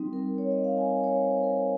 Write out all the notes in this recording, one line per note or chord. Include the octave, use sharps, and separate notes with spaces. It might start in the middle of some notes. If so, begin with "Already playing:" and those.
Already playing: G3 C4 D#4
A#4
C#5
D#5
F5
G#5
C#5
C5
C5
A#4